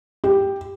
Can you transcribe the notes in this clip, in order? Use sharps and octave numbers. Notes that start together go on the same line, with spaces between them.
G4